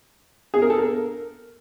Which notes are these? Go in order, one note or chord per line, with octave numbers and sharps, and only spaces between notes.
G#4
A#4
A4
A#4